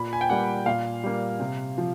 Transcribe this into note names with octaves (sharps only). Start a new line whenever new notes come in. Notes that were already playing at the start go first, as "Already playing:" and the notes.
Already playing: A#2 B5
G#5
G5
G3 A#3 F#5
A#2 F5
G3 A#3
C3
F3